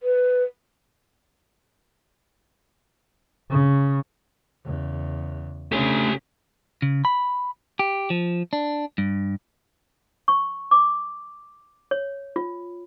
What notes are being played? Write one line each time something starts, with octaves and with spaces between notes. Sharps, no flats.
B4
C#3
E2 C#3
C#3 A3 C#4 D4 G4 G#5
C#3
B5
G4
F3
D4
G2
C#6
D6
C#5
F4